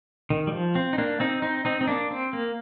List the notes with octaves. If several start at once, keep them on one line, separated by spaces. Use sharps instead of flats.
D#3
G3
F3
C4
D#4
A#3 D4
C4 D#4
C4 D#4
C4 D#4
C4
A#3 D4
C4
A#3